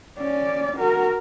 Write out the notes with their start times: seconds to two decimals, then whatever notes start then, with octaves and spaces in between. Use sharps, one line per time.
0.19 C#4 D5
0.77 F#4 A#4